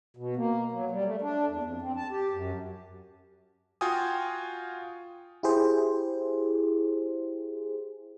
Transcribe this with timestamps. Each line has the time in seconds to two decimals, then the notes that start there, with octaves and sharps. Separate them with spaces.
0.17 B2
0.36 A#3
0.72 F#3
0.91 G3
1.05 A3
1.22 D4
1.47 E2
1.63 F2
1.82 C4
1.97 A5
2.10 G4
2.31 F#2
3.81 F4 F#4 F5 G5 G#5 D#6
5.43 E4 G4 G#4 C5